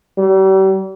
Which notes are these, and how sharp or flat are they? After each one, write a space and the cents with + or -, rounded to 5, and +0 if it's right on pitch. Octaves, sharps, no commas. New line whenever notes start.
G3 -40